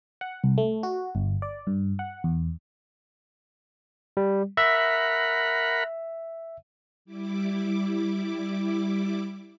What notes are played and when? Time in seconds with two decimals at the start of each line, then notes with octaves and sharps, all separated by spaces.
0.21 F#5
0.44 C2
0.58 A3
0.83 F#4
1.15 G1
1.42 D5
1.67 G2
1.99 F#5
2.24 E2
4.17 G3
4.57 A#4 E5 F#5 B5
7.05 G3 E4 D6